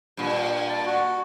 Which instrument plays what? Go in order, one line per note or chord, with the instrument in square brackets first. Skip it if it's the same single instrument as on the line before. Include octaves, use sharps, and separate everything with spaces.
[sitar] G2 A#2
[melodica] A5
F#4